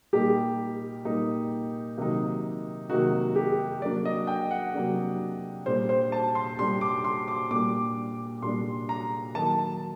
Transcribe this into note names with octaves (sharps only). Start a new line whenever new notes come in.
A#2 G3 A#3 D#4 G4
A#2 G3 A#3 D#4
C3 D#3 F#3 A#3 D#4
C3 D#3 F#3 A#3 D#4 F#4
G4
C3 F#3 A#3 D4 D5
D#5
G5
F#5
C3 F#3 A#3 D4
A#2 G3 D4 C5
C5
A5
C6
A#2 G3 D4 C6
D6
C6
D6
A#2 G3 D4 D6
A#2 G3 D4 C6
A#5
D#3 F#3 A#3 A5